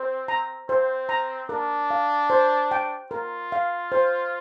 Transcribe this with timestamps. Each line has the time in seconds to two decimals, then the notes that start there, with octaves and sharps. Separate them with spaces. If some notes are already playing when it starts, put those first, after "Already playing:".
Already playing: C4 C5
0.28 A#5
0.69 C4 C5
1.09 A#5
1.49 D4 A#4
1.91 F5
2.30 C5
2.71 G5
3.11 F4 A#4
3.52 F5
3.92 C5